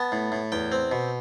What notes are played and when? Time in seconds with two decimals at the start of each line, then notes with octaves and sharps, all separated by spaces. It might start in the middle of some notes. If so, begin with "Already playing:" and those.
Already playing: B3 A5
0.12 A2
0.32 A2
0.52 E2 G5
0.72 C4
0.92 B2